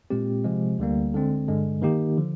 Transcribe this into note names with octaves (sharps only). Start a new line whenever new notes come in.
A#2 G#3 C4 G4
C3 F3 G#3
D2 D3 G3 A#3
D3 G#3 C4
G2 D3 G#3
D#3 A#3 D#4 G4
D3 F3